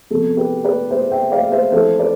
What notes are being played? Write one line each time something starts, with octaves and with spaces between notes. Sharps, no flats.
F2 C3 F3 B3 A4
G4 B4
B4 D5
C5 E5
E5 G5
D5 F5
C5 E5
F2 E3 A3 A4 C5
B4 D5